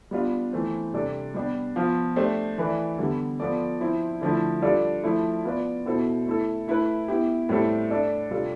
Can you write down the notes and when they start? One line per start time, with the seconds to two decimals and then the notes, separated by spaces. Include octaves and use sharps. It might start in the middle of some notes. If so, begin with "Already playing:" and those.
0.11 G3 B3 D4 F4
0.53 E3 A3 C4
0.94 C3 G3 D4 A4 D5
1.34 G3 B3 D4 G4
1.76 F3 B3 F4
2.16 A3 D4 G4 C5
2.58 E3 A3 E4 B4 D5
2.98 D3 G3 B3
3.40 F3 B3 F4 A4 D5
3.80 F3 C4 E4
4.21 D3 F3 A3 E4
4.62 G3 D4 F4 A4 D5
5.04 F3 A3 E4
5.45 B3 F4 B4 D5
5.85 B2 B3 E4 A4 C5
6.26 A3 E4 A4
6.68 A3 E4 B4
7.08 B3 E4 G4
7.49 A2 G3 C4 E4 A4
7.90 A3 D4 A4 D5
8.31 C3 G3 D4 F4 A4